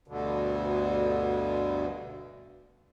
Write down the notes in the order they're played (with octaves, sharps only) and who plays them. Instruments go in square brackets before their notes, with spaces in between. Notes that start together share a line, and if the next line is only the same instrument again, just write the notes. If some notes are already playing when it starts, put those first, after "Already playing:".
[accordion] D2 G2 B2 D3